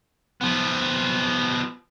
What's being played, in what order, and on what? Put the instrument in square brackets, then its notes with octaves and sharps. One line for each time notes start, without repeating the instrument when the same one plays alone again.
[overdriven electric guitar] F3 B3